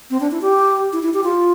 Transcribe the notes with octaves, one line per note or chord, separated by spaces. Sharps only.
C4
D4
E4
G4
E4
E4
G4
F4